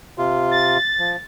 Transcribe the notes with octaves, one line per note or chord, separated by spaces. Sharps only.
C3 F4
A6
F3